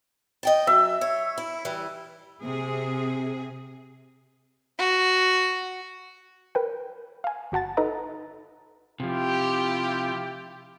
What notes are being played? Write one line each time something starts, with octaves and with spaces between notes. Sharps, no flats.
D#5 G5 A5
F#2 E5
C#5
E4
E3 G3
C3 G#4
F#4
A#4 B4 G5
F5 G#5
G1 F#4 F#5 A5 A6
D#4 A4 B4 D#5 A#5
C3 F3 E4 F4 G4